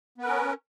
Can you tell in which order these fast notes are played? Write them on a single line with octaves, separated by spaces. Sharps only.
B3 B4 A#4 C#4